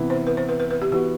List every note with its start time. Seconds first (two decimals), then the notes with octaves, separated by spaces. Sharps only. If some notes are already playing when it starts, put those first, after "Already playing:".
Already playing: C3 E3 B3 E4
0.10 C5
0.27 B4
0.37 C5
0.49 B4
0.60 B4
0.70 B4
0.82 G4
0.92 E3 B3 F#4 G4